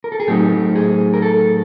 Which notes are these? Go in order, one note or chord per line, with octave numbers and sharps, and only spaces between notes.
A#4
A4
G#4
A2 F#3 A3 C4 D#4 G4
G#4
A#4
A4